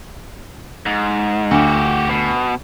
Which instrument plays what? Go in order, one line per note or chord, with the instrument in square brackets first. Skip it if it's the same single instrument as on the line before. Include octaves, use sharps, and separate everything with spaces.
[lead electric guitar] G#2
[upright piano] D2 [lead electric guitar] F#4 G4
[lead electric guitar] B2